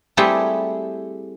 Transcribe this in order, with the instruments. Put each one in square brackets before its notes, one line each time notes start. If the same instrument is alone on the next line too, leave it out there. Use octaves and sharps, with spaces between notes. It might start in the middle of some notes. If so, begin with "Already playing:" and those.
[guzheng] G3 A3 C4 E4 G4 G#4